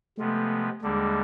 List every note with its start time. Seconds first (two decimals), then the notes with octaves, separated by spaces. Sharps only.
0.18 C3 F3 G#3 A3 B3
0.82 D#2 D3 G3 G#3 A#3 D4